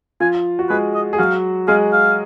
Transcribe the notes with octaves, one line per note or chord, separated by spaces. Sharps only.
F3 F4 G#5
F#4
G#3 G#4 B4
D#5
G#4
F#3 F#4 F5
G#3 G#4 F5
F5